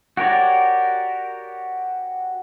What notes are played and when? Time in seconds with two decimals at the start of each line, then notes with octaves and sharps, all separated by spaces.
0.17 F#4 G4 A#4 C#5 D5